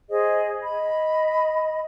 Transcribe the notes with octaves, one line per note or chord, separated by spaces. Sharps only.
G#4 C5 D#5
D#5 B5